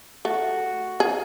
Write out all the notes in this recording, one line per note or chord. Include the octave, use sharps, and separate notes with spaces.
A3 F#4
G#4